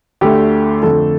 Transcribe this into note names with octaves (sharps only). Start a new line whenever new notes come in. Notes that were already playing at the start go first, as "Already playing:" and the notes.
D2 D3 A3 G4
F2 D3 F3 A3 A4